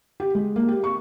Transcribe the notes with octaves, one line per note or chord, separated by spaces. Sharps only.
G4
G#3
A#3
G4
C#6